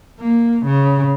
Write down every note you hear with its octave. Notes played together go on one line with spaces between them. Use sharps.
A#3
C#3